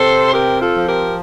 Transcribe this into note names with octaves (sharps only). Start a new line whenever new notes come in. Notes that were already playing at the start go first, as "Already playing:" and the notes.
Already playing: C3 A4 C5
C4 G4 A#4
F4 A4
F3
G4 A#4